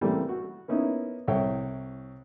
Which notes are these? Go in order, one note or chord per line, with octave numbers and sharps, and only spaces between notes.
C#3 E3 G3 A3 A#3 C4
F#4
A#3 B3 C#4 D#4 E4
C2 E4 C#5 G5